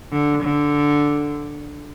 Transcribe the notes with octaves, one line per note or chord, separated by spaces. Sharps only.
D3
D3